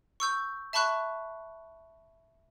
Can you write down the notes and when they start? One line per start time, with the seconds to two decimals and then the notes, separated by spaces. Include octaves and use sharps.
0.20 C#6 E6 G6
0.73 E5 A5 B5 C#6 F#6